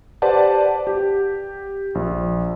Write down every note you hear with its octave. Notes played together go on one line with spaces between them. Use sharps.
G4 B4 C5 D5 F#5 A5
G4
A#1